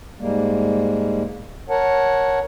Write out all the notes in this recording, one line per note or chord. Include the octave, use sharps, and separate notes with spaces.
G#2 G3 G#3 A#3
A#4 C#5 F#5 A5